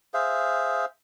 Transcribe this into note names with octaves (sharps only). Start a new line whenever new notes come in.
G#4 C5 E5 F5